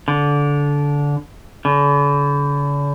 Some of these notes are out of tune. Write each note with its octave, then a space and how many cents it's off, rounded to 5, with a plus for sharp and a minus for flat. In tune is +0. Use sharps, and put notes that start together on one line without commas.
D3 -20
D3 -45